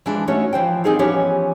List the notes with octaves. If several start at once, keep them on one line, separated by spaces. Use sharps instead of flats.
E3 F3 G#3 D4
A3 C#4 D#4 F#4 C#5
E3 F3 C5 G5
C4 D4 D#4 G#4 A#4 F5
E3 F3 B3 C#4 G4 C#5